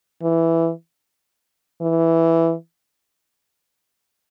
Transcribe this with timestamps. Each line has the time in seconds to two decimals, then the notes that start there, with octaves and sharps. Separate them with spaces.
0.22 E3
1.82 E3